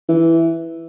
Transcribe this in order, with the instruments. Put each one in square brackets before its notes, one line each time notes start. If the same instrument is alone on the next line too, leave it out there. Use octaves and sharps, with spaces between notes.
[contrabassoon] E3